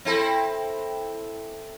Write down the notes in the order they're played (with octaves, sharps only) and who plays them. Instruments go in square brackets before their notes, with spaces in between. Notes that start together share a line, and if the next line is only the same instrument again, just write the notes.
[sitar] C4 E4 A4